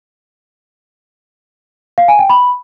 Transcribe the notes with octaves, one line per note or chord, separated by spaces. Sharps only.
F5
G#5
G5
B5